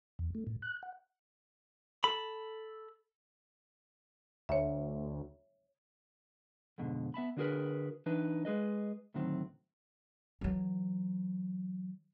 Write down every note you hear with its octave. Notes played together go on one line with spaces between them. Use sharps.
E2
A3
A2
F#6
F#5
A4 B5
D2 C#5 E5
F2 G#2 B2 D3
B3 E5 A5 B5
D3 D4 F#4 G#4 A#4 B4
E3 D4 D#4 B4
G#3 G#4 B4 D#5
D2 A2 D#3 F#3 C4
E3 F#3